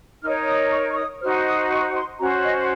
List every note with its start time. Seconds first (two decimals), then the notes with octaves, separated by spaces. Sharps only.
0.23 D#4 A#4 C#5 F6
0.47 D#6
0.72 C#6
0.90 C#6
0.97 D#6
1.21 D#4 F#4 C5 F6
1.46 D#6
1.71 C#6
1.95 C6
2.19 C#4 F#4 C5 A#5
2.44 D#5